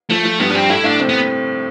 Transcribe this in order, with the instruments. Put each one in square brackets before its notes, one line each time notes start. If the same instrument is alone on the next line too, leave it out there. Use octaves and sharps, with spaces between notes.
[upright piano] F3 [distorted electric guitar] A3
[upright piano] F3
[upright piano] G2 G3 [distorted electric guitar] B3
[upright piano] G2 G3 [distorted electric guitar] C4
[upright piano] A2 A3 [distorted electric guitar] E4
[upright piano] A2 A3 [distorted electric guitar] D4
[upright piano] C3 C4
[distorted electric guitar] B3